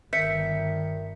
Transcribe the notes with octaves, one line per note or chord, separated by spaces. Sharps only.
G1 D#3 E5 G6 B6 C#7